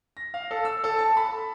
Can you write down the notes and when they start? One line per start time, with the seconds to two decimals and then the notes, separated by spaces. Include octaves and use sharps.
0.17 A#6
0.34 F5
0.51 A4
0.65 E6
0.84 A4
0.98 A5
1.17 B5